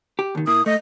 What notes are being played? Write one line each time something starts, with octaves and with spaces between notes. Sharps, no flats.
G4
D#2 D#3
A#2 A#3 E4 D#6
A3 D#5